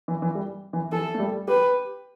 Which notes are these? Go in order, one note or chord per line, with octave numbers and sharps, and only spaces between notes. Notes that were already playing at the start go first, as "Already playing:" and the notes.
E3
E3
G3
E3
E3 A4
A3
G3
G4 B4